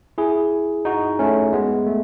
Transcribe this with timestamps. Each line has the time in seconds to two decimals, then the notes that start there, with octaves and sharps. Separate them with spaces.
0.18 E4 G#4
0.85 D#4 F#4
1.19 A3 C#4
1.53 G#3 B3
1.86 A3